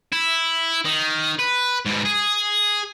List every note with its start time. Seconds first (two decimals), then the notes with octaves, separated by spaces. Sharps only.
0.13 E4
0.85 D#3
1.39 B4
1.86 G#2 B2
2.06 G#4